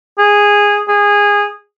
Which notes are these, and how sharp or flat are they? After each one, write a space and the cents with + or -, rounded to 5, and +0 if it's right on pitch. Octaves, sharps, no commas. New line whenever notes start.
G#4 -15
G#4 -20